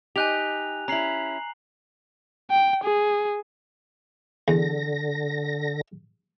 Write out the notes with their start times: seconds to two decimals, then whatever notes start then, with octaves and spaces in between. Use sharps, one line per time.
0.16 D#4 G4 G#5 F#6 F7
0.88 C#4 E4 A#5 C7 F#7
2.51 G5
2.84 G#4
4.48 E2 D3 A#6